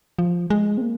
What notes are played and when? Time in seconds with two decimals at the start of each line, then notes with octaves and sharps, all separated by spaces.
0.19 F3
0.50 G#3
0.78 C4
0.81 A#3